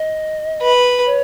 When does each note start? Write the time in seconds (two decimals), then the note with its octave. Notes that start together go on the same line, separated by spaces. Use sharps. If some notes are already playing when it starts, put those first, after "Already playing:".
Already playing: D#5
0.62 B4
1.06 C#5